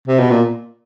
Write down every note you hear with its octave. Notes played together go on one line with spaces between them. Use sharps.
C3
B2
A#2